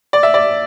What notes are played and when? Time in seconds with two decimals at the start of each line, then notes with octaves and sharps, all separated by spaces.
0.13 D5
0.23 E5
0.34 D5